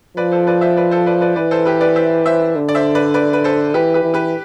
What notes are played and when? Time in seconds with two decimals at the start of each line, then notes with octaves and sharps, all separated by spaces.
0.17 F3 B4 D5
0.32 A4 C5
0.47 B4 D5
0.61 C5 E5
0.77 B4 D5
0.91 A4 C5
1.06 B4 D5
1.21 B4 D5
1.36 E3 B4 D5
1.51 A4 C5
1.65 G4 B4
1.81 B4 D5
1.96 C5 E5
2.26 C5 E5
2.56 D3
2.69 D5
2.75 C5 E5
2.95 B4 D5
3.14 B4 D5
3.33 B4
3.44 A4 C5
3.74 E3 G4 B4
3.94 G4 B4
4.03 E3
4.14 G4 B4